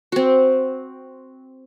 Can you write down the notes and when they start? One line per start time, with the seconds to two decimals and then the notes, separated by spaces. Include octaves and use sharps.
0.12 C4 F#4